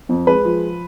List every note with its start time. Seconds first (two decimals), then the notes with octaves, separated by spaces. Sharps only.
0.09 F2
0.27 G#3 B4
0.45 F3